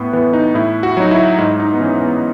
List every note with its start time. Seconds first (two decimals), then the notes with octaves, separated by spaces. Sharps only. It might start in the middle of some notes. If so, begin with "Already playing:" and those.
Already playing: A2 B3
0.13 E3 B3
0.33 D#4
0.55 A2 E4
0.83 F#4
0.97 F#3 D#4
1.11 E4
1.38 G#2 D#4
1.60 D#4
1.73 B3
1.80 E3 C#4
2.02 B3